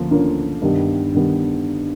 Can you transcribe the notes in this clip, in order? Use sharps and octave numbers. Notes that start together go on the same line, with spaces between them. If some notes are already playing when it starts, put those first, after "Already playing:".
Already playing: D2 D3 F3 A#3 C#4
D2 D3 F3 A#3 C#4
G2 D#3 G3 B3
G2 D#3 G3 B3